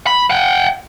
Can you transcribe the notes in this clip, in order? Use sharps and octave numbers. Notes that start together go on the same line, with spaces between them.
B5
F#5 G5